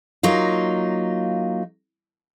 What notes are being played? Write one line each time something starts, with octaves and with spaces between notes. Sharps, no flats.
F#3 A#3 D#4 F4